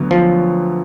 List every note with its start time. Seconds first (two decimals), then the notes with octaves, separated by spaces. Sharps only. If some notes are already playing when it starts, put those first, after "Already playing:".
Already playing: D2 D3 F#3 B3
0.11 F3